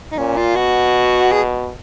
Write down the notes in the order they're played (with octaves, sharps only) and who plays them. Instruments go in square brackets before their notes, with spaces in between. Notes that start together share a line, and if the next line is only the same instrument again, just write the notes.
[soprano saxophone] D#4
[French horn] A#2 [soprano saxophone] C#4
[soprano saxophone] F4
[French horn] B2 [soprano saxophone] F#4
[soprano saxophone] G#4